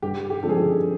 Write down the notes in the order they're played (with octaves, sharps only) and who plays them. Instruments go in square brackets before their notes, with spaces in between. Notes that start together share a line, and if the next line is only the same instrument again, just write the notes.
[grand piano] G2 [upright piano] G4
[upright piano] G4
[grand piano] D3 F3 G#3 C4 [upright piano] A4
[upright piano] G#4
G4